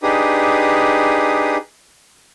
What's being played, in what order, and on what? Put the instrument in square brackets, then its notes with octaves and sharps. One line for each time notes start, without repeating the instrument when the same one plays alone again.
[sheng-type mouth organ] D4 D#4 G4 G#4 B4 D#6